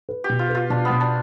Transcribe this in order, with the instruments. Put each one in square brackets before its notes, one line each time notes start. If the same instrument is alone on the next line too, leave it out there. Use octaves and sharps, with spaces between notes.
[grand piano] B4
[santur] G4
[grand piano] B2
[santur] F4
[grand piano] B4
[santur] F4
[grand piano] B2 [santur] D4
[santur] B3
[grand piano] B2
[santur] D4